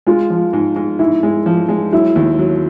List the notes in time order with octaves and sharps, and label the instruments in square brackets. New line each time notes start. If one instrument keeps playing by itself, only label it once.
[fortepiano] G#3 [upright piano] F4
[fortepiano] F3
G#2
G#2
[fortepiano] G#2 [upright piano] E4
[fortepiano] G#3
F3
G#3
[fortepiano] F#3 [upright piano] E4
[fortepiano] D#2
F#3